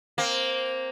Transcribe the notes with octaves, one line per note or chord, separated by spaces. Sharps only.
A#3 C4